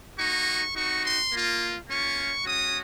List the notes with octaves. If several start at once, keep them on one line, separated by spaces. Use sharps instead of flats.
A#3 D#4 F#4 C#6
C4 D#4 F#4 C#6
C6
A#3 F4
A#3 C#4 F4 C#6
G#3 C#4 F#4 D#6